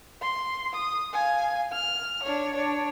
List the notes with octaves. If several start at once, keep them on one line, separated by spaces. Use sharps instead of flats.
C6
D#6
F5 G#5
F6
D4 C#5
D4 C#5